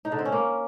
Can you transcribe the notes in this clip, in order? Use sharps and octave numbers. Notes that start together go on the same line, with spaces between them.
D#4
D3
C4
C#4
A#3